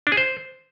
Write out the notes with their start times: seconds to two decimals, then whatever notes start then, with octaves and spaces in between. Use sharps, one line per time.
0.07 D4
0.12 G#4
0.17 C5